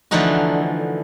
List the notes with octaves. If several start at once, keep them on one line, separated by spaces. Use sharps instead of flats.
D3 E3 F3 A3 D#4 F#4